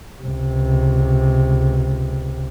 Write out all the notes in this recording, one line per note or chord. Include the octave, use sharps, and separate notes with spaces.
C#2 C3